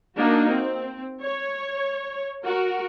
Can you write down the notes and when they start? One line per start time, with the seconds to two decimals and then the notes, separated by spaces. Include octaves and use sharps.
0.18 A#3 D4 D#4 F#4
0.52 C4
1.22 C#5
2.44 F#4 A#4